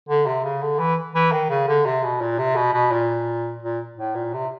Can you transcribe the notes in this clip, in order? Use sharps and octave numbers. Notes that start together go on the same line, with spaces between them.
D3
C3
C#3
D3
E3
E3
D#3
C#3
D3
C3
B2
A#2
C3
B2
B2
A#2
A#2
A2
A#2
C3